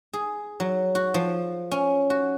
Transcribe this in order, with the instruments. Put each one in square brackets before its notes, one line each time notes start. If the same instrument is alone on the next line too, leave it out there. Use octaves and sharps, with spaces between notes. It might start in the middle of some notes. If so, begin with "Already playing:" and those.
[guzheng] G#4
F#3
F#4
F3
C#4
F#4